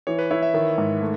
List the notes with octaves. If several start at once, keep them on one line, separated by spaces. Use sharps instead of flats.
E3 C#5
B4
E4 C#5
E5
D#3 E5
G#2
A3